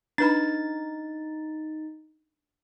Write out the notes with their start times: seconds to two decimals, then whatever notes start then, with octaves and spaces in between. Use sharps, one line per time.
0.18 D4 D#4 B4 B5 A6